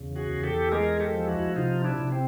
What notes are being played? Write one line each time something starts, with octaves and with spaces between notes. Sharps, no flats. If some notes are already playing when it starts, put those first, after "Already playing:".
Already playing: E2 C#3
F#4 G#4
E2
G4 A4
G#3 G#4 A#4
G4 A4
F3
E4 F#4
C3 D#4 F4
D4 E4
C3
C4